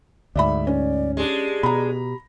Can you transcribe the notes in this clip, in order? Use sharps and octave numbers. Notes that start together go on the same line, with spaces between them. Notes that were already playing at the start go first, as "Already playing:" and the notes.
D2 G#2 D5 E5 B5
C#4 D5
G#3 D4 G4
B2 A#5 B5